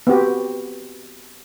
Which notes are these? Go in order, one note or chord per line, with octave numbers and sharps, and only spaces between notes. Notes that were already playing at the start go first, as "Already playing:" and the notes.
B3 C4 F#4 G4